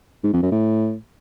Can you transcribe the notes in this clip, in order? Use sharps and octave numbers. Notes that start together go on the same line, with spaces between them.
G#2
F2
F#2
A2